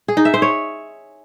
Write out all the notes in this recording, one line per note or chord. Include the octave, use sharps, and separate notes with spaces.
G#4
D#4
E5
C5
C#5